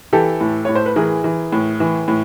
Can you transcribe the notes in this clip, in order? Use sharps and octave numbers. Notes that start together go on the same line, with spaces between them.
E3 G4 A4
A2
A2 C#5
C5
B4
E3 G#4 A#4
E3
A2
E3
A2